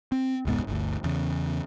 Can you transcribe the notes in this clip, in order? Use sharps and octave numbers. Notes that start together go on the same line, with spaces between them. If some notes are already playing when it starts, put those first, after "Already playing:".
C4
E1 C#2 G#2 B3
G1 D2
E2 C#3